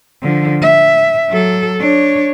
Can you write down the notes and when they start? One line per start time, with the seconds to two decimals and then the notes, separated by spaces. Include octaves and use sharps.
0.22 D3 F3
0.62 E5
1.29 F#3 A4
1.80 D4 C#5